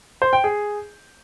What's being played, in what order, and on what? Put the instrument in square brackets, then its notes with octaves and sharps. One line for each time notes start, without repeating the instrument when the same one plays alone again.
[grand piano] C5
G5
G#4